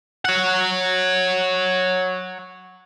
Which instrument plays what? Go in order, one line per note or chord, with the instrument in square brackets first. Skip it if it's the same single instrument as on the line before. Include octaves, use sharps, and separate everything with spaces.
[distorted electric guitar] C#5 F#5